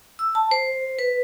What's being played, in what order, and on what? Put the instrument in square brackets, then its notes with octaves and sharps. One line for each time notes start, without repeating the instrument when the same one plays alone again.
[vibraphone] E6
A5
C5
B4